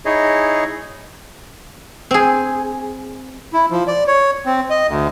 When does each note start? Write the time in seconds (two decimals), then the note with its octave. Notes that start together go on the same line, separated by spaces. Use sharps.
0.05 D#4 E4 G#4 C#5 D#5
2.11 C4 G#4
3.53 E4
3.71 F3
3.87 D5
4.07 C#5
4.46 C4
4.70 D#5
4.88 D2